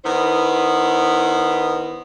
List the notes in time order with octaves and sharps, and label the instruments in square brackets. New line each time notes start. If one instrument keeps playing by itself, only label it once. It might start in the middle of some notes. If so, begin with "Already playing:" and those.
[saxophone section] D#3 B3 E4 C5